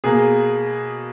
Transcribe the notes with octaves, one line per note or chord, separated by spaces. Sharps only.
B2 A#3 G#4